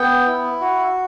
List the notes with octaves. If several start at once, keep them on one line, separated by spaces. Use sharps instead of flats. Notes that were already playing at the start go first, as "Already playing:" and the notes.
Already playing: B3 G5
E4
F#4